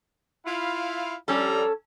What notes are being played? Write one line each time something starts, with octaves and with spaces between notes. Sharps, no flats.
E4 F4 F5
F3 G3 C#4 A4 A#5